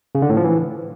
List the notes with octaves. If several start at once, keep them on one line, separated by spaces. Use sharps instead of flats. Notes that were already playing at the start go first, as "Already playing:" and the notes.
C#3
D3
A2
F3
E3